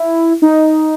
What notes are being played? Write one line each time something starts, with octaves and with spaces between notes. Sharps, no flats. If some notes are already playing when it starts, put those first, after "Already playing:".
Already playing: E4
D#4